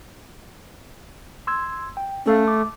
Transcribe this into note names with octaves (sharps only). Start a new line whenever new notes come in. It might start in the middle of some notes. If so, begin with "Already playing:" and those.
C6 E6 G#6
G5
A3 C#4 A4 F5
D6